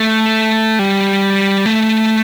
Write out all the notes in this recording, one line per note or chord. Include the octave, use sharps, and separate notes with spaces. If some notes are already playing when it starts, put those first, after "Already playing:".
Already playing: A3
G3
A3